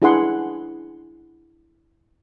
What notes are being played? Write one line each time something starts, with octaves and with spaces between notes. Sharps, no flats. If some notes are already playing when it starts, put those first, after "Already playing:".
D4 E4 G#4 B4 F#5 C6